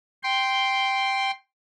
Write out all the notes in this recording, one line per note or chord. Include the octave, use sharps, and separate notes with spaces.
G5 C6